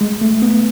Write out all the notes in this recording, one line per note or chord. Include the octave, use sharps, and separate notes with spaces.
G#3
A3
B3